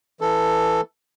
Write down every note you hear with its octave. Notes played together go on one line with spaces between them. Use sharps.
E3 A4